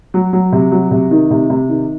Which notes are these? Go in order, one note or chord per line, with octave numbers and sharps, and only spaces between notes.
F#3
F#3
C3
F#3
C3
D#3
C3
C3
D#3